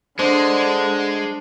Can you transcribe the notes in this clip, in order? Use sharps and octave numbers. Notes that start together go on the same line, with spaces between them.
D3 G#3 D4 C5